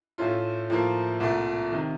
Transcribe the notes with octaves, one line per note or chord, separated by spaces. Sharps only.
A2 A3 C#4 F4
A2 F3 A#3 F4
C2 A#2 A3
C3 D#3